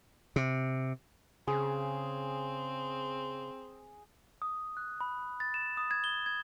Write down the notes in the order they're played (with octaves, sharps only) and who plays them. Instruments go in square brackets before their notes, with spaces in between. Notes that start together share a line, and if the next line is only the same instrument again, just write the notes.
[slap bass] C3
[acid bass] C#3 [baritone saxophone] C4 [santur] G#4
[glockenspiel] D#6
F#6
B5
A6
E7
D#6
G#6
G7
G#6